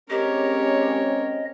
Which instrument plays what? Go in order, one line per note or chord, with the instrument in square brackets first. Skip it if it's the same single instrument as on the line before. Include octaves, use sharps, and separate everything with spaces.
[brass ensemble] G#3 C4 C#4 [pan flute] G4 [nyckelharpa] A#4 C#5 [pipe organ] D#5